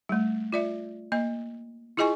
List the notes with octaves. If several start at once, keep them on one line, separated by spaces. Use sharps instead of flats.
G3 A3
F4 D5 E5
A#3 D#5
E4 F4 G#4 D#5 G#5 C#6